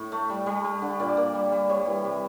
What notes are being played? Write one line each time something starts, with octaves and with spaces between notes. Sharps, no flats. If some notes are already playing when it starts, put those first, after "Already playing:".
Already playing: A2
A3
G3
G3
G3
D3
A#2 D5
A#2
G3
G3
G3 C#5
E3
C3